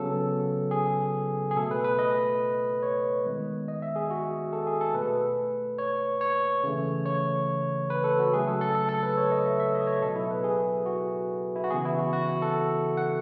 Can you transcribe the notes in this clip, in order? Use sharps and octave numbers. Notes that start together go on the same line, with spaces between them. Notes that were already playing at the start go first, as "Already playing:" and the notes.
Already playing: C#3 F#3 B3 A4
G#4
G#4
B2 A3 A4
B4
B4
D#5
C#5
D#3 G#3 B3
D#5
E5
G#4
F#4
A4
G#4
A4
B2 A3 B4
C#5
C#5
C#3 E3 A3
C#5
B4
A4
F#4
C#3 F#3 A3 G#4
A4
A4
A4
A4
B4
C#5
D#5
E5
E5
D#5
C#5
B2 F#3 B3 A4
E4
B4
G#4
F#4
E4
F#4
C#3 E3 B3 G#4
E4
F#4
F#4
A4
F#5